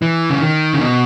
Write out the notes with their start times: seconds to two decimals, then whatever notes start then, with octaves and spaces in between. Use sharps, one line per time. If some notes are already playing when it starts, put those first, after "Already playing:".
0.02 E3
0.30 C#3
0.42 D#3
0.74 C#3
0.81 B2